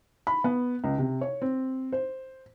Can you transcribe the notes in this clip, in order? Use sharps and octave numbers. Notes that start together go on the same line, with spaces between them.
B5
B3
C#2
C3
C#5
C4
C5